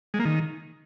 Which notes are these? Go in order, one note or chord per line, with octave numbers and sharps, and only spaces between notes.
G#3
A#3
D#3